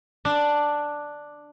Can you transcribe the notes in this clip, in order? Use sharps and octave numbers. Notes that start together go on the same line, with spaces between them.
D4